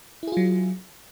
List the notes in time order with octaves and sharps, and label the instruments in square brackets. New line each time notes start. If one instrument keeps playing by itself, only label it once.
[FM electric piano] E4
G#4
F4
F#3